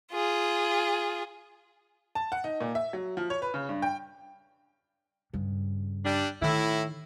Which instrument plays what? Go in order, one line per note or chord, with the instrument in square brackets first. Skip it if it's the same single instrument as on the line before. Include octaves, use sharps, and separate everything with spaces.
[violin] F4 G#4
[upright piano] A5
F#5
D#4
A#2
E5
F#3
F3
C#5
B4
C#3
G2
G5
[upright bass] G2 C#3
[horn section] G3 D4
[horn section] A2 E4 [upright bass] D#3